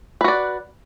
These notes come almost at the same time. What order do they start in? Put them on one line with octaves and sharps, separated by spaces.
B4 F#4 D5